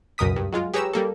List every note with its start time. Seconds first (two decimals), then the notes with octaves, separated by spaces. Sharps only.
0.18 C#2 F#2 B2 A#4 D#6 B6
0.36 G2
0.52 F#3 G#3 F4
0.74 G4 G#4 B4 C#5 A#5 E6
0.93 G3 A#3 A4